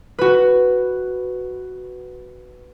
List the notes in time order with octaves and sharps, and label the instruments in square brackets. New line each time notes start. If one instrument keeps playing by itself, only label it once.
[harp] F#4 B4